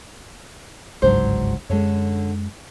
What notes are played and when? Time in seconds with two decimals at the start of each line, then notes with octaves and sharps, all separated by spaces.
1.02 G1 C#2 G#2 F#3 D4 C5
1.69 F#2 D3 G#3 C#5